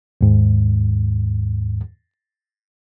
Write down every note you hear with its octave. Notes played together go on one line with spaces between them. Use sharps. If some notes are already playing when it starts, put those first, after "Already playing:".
D#2 G#2